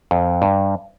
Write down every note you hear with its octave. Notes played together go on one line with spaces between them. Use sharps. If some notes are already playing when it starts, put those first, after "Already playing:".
F2
G2